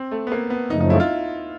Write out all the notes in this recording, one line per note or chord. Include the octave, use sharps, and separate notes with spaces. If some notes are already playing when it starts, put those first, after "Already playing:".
Already playing: C4
A3
B3
A#3
B3
F#2 C#3 F3 A3 D#4
D#4
E4
F4